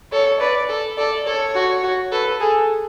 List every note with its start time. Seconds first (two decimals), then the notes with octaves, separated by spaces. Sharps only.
0.12 A4 C#5
0.40 B4 D5
0.69 A4
0.97 A4 D5
1.26 A4 C#5
1.55 F#4
1.83 F#4
2.12 A4 B4
2.40 G#4 A4